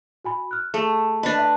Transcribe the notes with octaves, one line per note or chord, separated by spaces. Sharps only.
F#4 G#5 B5
F6 F#6
A3 G#4 A4
D4 B4 D#5
E5